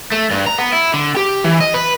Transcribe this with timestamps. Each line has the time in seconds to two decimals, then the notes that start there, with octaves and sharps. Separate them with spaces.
0.12 A3
0.31 G2
0.46 A#5
0.58 B3
0.73 E4
0.94 D3
1.17 G4
1.44 E3
1.61 D#5
1.74 B4